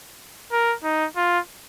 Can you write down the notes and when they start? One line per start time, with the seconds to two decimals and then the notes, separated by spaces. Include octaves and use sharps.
0.52 A#4
0.84 D#4
1.17 F4